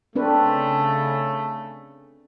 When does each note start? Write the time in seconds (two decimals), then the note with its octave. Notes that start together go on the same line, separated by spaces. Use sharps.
0.15 C#3 A3 C4 D4 B4